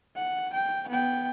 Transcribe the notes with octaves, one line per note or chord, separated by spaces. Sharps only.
F#5
G5
B3 G5